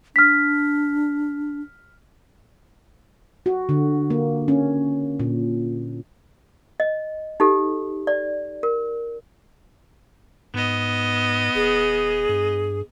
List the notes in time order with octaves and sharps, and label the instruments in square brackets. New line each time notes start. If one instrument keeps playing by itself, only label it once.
[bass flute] D4 [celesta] F6 B6
[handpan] F#4
D3
A#3
C#4
A#2
[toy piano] D#5
D#4 G4 A4
D5
A#4
[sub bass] G#2 [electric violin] B3 D#5
[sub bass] D#1 [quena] G#4
[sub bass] G2